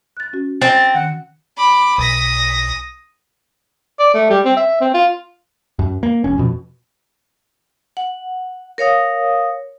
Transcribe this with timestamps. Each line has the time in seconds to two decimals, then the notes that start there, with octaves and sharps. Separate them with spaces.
0.17 F#6 A6
0.33 C#4 F#4
0.62 C4 A6
0.94 D#3 F#5
1.57 B5 D6
1.98 B1 D#6 A#6 B6
3.99 D5
4.14 A3
4.30 G3
4.45 C4
4.57 E5
4.81 C4
4.94 F4
5.79 F#2
6.03 A#3
6.24 F1 C#4
6.38 F2 B2
7.97 F#5
8.78 A#4 C#5 F5 D#6